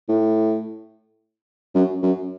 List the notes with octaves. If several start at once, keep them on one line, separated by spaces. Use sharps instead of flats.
A2
F#2
F#2